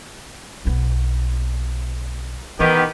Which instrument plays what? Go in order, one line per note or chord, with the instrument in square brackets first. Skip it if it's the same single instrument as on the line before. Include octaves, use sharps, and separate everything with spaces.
[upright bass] B1 B3
[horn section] D#3 B3 G4 [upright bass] E3 E4